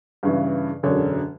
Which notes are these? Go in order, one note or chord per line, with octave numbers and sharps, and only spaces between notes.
G2 C#3 E3
E1 F#2 D3 G#4 C#5